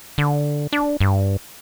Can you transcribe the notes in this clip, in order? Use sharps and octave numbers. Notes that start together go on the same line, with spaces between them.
D3
D4
G2